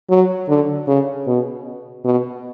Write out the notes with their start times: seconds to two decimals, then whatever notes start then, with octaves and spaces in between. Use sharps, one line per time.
0.10 F#3
0.48 D3
0.88 C#3
1.27 B2
2.05 B2